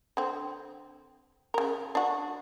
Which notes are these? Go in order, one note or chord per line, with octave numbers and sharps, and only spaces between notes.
D3 C4
C#3 A#4
D4 F#4